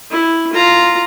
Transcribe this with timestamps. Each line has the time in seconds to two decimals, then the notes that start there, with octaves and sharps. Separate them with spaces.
0.11 E4
0.53 F4 A#5